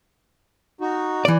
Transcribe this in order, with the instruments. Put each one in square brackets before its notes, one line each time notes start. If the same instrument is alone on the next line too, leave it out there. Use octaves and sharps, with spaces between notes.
[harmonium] D#4 F#4
[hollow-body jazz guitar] E3 D5